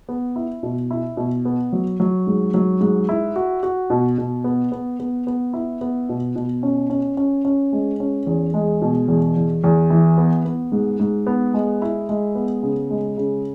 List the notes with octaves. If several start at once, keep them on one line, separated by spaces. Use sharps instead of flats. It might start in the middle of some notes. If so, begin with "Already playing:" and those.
B3
E4
B2
E4
B2
B3
F#3
F#3
G#2
F#3
G#2
E4
F#4
F#4
B2
B2
B3
B3
B3
B3
E4
B3
B2
B2
C#4
C#4
C#4
C#4
G#3
C#4
E2
G#3
B2
E2
E2
E2
E3
B3
B3
G#2
G#2
B3
G#3
E4
G#3
B3
C#3
G#3
C#3